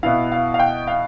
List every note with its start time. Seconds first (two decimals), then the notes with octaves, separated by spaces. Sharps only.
0.03 B2 B3 E4 F5
0.32 F5
0.54 F5
0.59 G5
0.87 F5